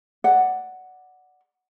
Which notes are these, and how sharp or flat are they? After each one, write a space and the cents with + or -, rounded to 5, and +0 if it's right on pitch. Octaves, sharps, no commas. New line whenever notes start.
D5 +5 F#5 +0